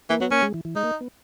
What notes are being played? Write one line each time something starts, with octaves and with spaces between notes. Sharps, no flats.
E3 A#3
F#3 B3
A#3 C#4
G#3
E3
E3
G#3 D#4
A#3
B3